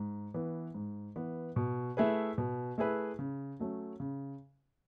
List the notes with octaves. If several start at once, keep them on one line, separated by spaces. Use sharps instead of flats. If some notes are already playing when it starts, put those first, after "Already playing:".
Already playing: G#2
E3 B3
G#2
E3 B3
B2
A3 E4 G#4 B4
B2
A3 E4 G#4 B4
C#3
F#3 A3 C#4
C#3